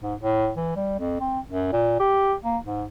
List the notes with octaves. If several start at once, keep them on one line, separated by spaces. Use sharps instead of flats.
G#2
A2
E3
G3
F2
C4
F#2
A#2
G4
A#3
G#2